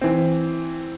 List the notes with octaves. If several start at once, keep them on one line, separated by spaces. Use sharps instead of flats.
E3 C4